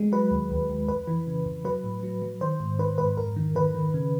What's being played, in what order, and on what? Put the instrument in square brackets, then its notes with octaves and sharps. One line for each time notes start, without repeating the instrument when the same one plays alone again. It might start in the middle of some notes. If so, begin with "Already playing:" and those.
Already playing: [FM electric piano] G#3
F#3 B4
D#2
D#2
D#2
F2 B4
E3
C#3
F2
F#3 B4
A2
F#3
F#3
D#3 C5
G#2
D#3 B4
G#2 B4
F2 A#4
D#3
D#3 B4
D#3
C#3